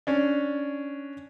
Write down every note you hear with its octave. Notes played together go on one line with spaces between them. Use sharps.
C#4 D4